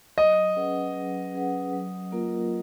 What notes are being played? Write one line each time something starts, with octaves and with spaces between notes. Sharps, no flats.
F#3 D#5
C#4 G#4 B4 F#5
F#3
C#4 G#4 B4 F#5
F#3
A#3 F4 A#4